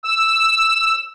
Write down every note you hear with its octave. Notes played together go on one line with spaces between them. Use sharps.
E6